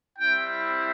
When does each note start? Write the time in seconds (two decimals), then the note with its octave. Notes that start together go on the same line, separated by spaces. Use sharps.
0.18 G3 C4 E4 G5